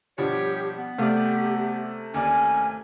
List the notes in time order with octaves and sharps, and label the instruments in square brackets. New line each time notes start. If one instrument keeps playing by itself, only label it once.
[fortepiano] G2 B2 F3 [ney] G4 [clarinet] C#5
[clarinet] B3
[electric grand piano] C3 A3 [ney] G4 [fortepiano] D5 F5
[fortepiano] D#2 D5 [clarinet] C#4 [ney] G#5